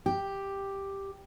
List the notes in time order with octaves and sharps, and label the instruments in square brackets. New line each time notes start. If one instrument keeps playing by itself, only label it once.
[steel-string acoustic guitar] G4